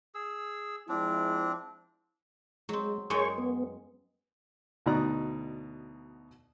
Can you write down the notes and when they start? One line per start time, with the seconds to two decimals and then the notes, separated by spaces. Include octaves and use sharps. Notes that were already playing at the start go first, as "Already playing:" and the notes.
0.15 G#4 E6
0.89 F3 G#3 C4 D4 E4
2.69 F#3 G#3 C4
3.10 F#2 G#3 G#4 C#5 G5 C#6
3.38 B3
4.86 D2 B2 D#4 D5 A#5 F#6